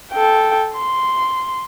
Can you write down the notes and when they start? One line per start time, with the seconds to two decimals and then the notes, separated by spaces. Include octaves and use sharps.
0.13 A4 G5
0.75 C6